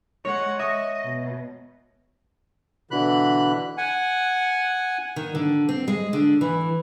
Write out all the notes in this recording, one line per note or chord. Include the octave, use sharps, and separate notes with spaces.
G#3 C#5 F#5
D#5 E5 C#6 D#6
B2
B2 D3 E3 B5 F#6
F#5 G#5
D#3
D3
C4
G#3
D3
E3